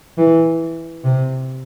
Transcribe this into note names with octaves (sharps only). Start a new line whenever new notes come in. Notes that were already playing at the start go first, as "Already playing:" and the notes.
E3
C3